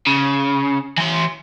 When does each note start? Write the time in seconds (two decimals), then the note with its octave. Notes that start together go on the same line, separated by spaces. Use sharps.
0.07 C#3
0.98 E3 C6